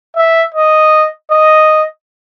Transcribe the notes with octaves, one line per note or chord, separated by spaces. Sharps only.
E5
D#5
D#5